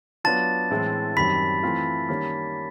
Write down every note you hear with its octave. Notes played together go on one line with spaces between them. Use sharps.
F#3 B3 D4 F4 A5 A6
A2 E3 G#3 C4 E4
F#2 D#3 G3 C4 B5 B6
E3 A3 C4 F4
D#3 G3 A#3 C#4